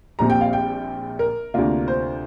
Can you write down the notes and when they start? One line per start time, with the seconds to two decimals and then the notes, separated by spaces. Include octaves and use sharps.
0.19 A#1 A#2 G3 C4 A#5
0.30 G5
0.41 F5
0.53 G5
1.19 A#4
1.54 D2 C3 A#3 D4 F4
1.88 C5